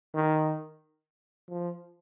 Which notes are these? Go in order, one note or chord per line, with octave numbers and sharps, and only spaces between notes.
D#3
F3